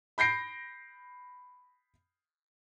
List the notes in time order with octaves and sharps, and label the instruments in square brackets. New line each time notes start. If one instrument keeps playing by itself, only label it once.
[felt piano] B5 G6 A#6 C7 D7